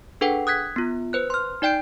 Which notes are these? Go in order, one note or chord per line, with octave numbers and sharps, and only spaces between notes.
D4 G#4 A4 B4 F#5 G5
D#6 F#6 G#6 B6
B3 F4
B4 C5 F#6
C6 F6
D#4 D5 G5 G6 D7